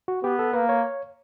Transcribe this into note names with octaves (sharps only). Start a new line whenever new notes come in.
F#4
B3 G4
A4
A#3 B4
C#5